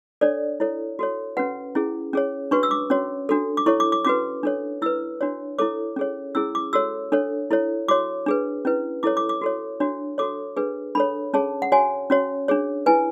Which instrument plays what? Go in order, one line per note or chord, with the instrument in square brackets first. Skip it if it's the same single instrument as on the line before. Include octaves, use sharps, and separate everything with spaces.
[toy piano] D4 A4 C#5 D5
E4 A4 C#5
F#4 A4 C#5
C#4 F#4 B4 F#5
C#4 E4 G#4
C#4 G#4 C#5
D4 F#4 B4 C#6
E6
D6
C#4 F#4 C#5
D4 F#4 A4
D6
E4 A4 C#5 C#6
D6
D6
C#4 F#4 B4 D6
D4 A4 C#5
E4 B4 E6
D4 F#4 C#5
E4 A4 C#5 D6
C#4 G#4 C#5
C#4 E4 G#4 E6
D6
F#4 A4 C#5 E6
D4 A4 C#5
E4 A4 C#5
F#4 C#5 D6
D4 G#4 B4
C#4 E4 B4
E4 A4 C#5 D6
D6
D6
F#4 A4 C#5
D4 F#4 C#5
F#4 A4 C#5 D6
D4 G#4 B4
D4 A4 C#5 B5
C#4 G#4 C#5 A5
F#5
F#4 C#5 G#5
C#4 F#4 C#5
D4 G#4 C#5
E4 B4 G#5